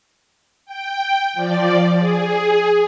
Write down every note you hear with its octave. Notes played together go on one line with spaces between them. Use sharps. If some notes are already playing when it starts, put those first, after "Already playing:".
G5
F3 D5
G#4